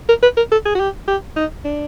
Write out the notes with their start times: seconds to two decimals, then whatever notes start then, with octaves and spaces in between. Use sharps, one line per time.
0.09 A#4
0.23 B4
0.37 A#4
0.52 A4
0.66 G#4
0.75 F#4
0.80 G4
1.08 G4
1.37 D#4
1.65 D4